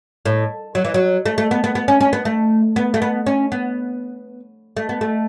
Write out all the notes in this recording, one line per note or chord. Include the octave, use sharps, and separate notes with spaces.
A2
F#3
E3
F#3
A3
A3
B3
B3
B3
C#4
C#4
B3
A3
B3
A3
B3
C#4
B3
A3
B3
A3